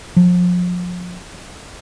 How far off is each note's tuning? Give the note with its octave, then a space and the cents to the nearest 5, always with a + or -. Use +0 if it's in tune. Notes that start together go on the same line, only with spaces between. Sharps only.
F3 +35